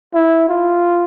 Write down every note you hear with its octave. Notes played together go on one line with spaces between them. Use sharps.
E4
F4